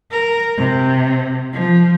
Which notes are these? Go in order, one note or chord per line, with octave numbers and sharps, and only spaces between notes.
A#4
C3
F3